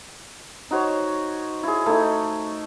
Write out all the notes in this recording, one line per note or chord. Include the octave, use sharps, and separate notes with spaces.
D#4 F#4 C5 C#5
E4 G#4
A3 D#4